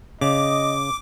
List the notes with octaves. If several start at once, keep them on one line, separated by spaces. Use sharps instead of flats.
C#3 D#5 D6